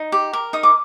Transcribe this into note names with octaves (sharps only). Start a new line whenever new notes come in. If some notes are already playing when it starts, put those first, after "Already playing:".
Already playing: D#4
G4
A#4
D#4 D#6
D6